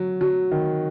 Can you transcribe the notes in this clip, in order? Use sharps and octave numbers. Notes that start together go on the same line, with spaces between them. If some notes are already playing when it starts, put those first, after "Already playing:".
Already playing: F#3
F#3
D#3